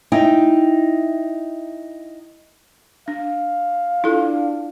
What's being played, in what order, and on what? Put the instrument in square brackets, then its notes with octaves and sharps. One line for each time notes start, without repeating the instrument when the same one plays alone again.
[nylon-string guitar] D#4 E4 G5
[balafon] D4 [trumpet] F5
[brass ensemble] D4 [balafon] E4 F4 A4